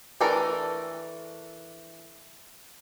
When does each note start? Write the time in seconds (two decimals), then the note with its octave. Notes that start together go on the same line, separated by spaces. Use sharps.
0.21 E3 A3 D4 A4 A#4